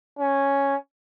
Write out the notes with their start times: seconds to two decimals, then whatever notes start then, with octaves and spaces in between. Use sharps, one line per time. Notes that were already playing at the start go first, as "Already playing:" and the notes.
0.19 C#4